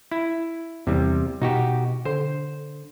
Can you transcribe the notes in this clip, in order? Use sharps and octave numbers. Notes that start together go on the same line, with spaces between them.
E4
E2 C3 G3
B2 D#4 F#4 G4
D3 C5